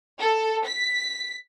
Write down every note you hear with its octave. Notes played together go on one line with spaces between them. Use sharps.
A4
B6